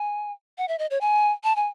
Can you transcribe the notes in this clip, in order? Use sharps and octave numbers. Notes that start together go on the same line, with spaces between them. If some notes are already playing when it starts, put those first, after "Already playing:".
Already playing: G#5
F#5
E5
D#5
C#5
G#5
A5
G#5